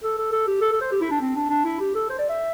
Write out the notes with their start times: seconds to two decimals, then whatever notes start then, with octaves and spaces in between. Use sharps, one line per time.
0.04 A4
0.18 A4
0.32 A4
0.47 G4
0.61 A4
0.72 A4
0.81 C5
0.92 G4
1.01 E4
1.11 D4
1.21 C4
1.36 D4
1.50 D4
1.65 E4
1.80 G4
1.95 A4
2.10 C5
2.19 D5
2.29 E5